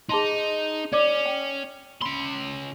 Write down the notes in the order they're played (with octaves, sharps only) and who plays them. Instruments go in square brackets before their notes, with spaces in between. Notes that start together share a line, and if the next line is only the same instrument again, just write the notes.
[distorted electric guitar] D#4 [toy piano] G#4 A5 C6
[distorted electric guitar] C#4 [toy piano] D5 D6
[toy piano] G5
[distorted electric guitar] C#3 C6 [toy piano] B5